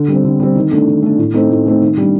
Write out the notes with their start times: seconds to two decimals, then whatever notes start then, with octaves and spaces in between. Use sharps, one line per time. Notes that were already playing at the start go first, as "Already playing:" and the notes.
Already playing: D3
0.08 G3 C4
0.24 D3
0.40 G3 C4
0.55 D#3
0.71 A3 D4
0.87 D#3
1.03 A3 D4
1.18 A2
1.34 A3 C4 D#4
1.50 A2
1.66 A3 C4 D#4
1.82 D#3
1.98 G3 D4